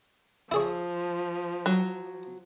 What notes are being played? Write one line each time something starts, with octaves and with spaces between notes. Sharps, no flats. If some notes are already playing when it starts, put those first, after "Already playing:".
F3 E4 G#4 C#5
F#3